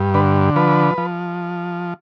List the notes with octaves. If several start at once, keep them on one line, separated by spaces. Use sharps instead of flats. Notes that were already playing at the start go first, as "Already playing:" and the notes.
Already playing: G2
D3 B4
F3 B4
F3